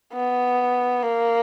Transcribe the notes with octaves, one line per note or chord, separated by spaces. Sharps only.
B3
A#3